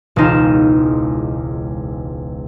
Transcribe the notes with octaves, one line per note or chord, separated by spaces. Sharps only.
E1 C#2 D#4 F4 E7